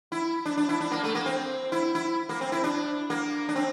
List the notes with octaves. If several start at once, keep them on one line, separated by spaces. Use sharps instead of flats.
E4
D4
D4
E4
D4
A#3
A3
A#3
C4
E4
E4
A#3
C4
E4
D4
A#3
D4
C4